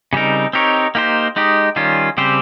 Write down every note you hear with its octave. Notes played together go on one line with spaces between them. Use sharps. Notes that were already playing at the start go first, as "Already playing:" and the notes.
C#3 G3 C4 D#4 A#4
C4 D#4 G4 A#4 C#5
A#3 D#4 G4 C5
G#3 D#4 G4
D#3 G3 C#4 F4
C#3 G3 C4 G4 C5